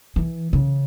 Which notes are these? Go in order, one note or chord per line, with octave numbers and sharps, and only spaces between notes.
E3
C#3